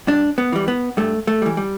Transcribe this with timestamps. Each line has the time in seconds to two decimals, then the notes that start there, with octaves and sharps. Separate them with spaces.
0.07 G2 D4
0.38 B3
0.52 E3 G3
0.68 B3
0.97 G2 A3
1.27 A3
1.42 E3 G3
1.57 G3